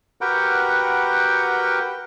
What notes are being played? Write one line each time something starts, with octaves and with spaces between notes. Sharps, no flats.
F#4 G4 A#4 B4 F#5 G5